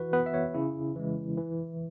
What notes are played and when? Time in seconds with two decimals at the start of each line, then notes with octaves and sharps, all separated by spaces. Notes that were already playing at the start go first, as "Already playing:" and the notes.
Already playing: E3 F#4 B4
0.13 B3 B4
0.26 E5
0.34 C#5
0.54 C#3 E4
0.96 E3 G#3
1.38 E3